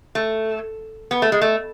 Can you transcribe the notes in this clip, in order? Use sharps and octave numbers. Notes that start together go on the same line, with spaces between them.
A3
B3
A3
G#3
A3